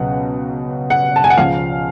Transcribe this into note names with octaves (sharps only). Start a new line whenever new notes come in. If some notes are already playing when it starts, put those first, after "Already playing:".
Already playing: C#2 B2 F#3 F#5
F#5
A5
G#5
F#5
C#2 C#3 F3 F5